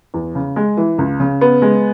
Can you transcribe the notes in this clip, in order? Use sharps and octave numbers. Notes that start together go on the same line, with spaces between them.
E2
C#3
G#3
E3
C#2
C#3
B3
G#3